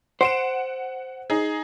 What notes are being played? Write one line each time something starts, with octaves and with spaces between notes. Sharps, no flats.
C5 F#5 D7 E7
D#4 G#4